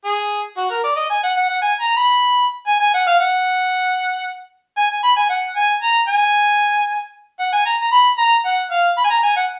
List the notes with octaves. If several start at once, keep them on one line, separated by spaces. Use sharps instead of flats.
G#4
F#4
A#4
D5
D#5
G#5
F#5
F#5
F#5
G#5
A#5
B5
G#5
G#5
F#5
F5
F#5
G#5
G#5
B5
G#5
F#5
G#5
A#5
G#5
F#5
G#5
A#5
A#5
B5
A#5
F#5
F5
B5
G#5
A#5
G#5
F#5